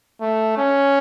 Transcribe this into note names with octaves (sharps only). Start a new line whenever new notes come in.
A3
C#4